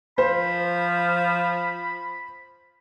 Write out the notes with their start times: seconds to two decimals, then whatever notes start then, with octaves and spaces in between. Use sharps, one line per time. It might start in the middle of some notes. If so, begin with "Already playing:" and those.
0.18 F3 C5 B5